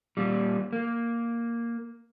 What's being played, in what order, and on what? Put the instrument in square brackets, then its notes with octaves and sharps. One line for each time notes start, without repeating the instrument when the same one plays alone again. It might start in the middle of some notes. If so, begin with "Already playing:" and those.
[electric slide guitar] A#2 G3
A#3